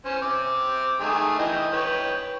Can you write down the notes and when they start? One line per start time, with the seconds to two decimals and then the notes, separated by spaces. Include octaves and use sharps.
0.05 C#4 C5
0.22 C4 D6
1.00 D#3 A3 G#4
1.38 E3 D#5 G5
1.73 B4 C#5 G5